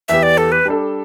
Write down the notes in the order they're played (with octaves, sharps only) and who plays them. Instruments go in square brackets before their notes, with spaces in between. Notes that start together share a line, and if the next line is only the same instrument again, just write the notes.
[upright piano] E2 E3 B3 G4 [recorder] E5
[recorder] D5
A4
B4
[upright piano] G3 D4 A4